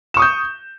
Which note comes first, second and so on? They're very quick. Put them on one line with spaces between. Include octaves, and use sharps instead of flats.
E7 C#6 D#6 G6